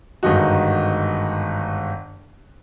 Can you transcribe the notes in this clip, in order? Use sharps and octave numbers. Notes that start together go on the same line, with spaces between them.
G1 G#2 D#3 D#4 F#4